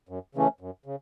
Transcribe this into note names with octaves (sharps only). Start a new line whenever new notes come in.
F#2
C#3 E3 A3 C#4
F#2
C#3